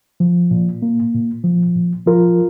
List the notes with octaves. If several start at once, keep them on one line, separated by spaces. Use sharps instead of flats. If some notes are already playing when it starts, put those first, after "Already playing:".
F3
A#2
A#3
A#2
F3
A#2
F3 F4 A#4